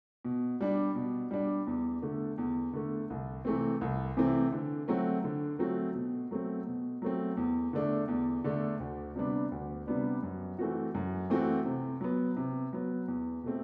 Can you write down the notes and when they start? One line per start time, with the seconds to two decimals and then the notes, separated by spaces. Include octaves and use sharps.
0.25 B2
0.61 G3 D4
0.95 B2
1.31 G3 D4
1.67 E2
2.02 D3 A3
2.38 E2
2.73 D3 A3
3.10 C2
3.45 C3 E3 A3 C4
3.81 C2
4.17 C3 E3 A3 C4
4.52 D3
4.88 F#3 A3 C4 F#4
5.24 D3
5.59 F#3 A3 C4 F#4
5.95 B2
6.31 F#3 A3 C4
6.67 B2
7.02 F#3 A3 C4
7.37 E2
7.73 D3 A3 D4
8.08 E2
8.44 D3 A3 D4
8.80 D2
9.16 C3 G3 B3 D4
9.52 D2
9.87 C3 G3 B3 D4
10.23 F#2
10.59 E3 A3 C4 F#4
10.95 F#2
11.30 E3 A3 C4 F#4
11.66 C3
12.01 F#3 B3
12.37 C3
12.73 F#3 B3
13.08 E2
13.43 B2 A3 C4